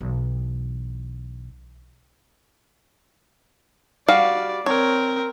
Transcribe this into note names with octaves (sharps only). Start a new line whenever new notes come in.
B1 E3
G3 F#4 D5 F5
C4 A#4 C#5